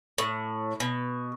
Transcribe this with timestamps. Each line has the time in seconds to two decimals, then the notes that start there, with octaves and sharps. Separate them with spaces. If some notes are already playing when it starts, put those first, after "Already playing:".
0.18 A2
0.80 B2